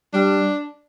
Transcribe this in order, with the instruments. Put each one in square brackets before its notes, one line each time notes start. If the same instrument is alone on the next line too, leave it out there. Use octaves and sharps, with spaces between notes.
[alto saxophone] G3 [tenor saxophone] D4